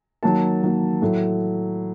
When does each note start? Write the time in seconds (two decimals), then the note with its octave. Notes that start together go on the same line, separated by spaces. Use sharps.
0.23 D#3 F#3 A#3 A5
0.62 D#3 F#3 A#3
1.02 A2 F#3 A3